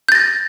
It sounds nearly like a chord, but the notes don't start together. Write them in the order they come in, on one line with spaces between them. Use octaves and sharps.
G6 A6 A#6